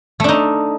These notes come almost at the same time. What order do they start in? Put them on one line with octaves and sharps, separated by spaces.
A3 D4 D#4